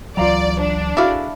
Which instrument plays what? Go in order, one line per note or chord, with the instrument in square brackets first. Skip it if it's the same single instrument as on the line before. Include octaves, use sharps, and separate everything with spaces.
[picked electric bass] C#2 E3 F#3 [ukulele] F4 F5 A#5 [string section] D5
[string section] D4
[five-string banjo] E4 D5 F5 [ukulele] F#4 G#4 A4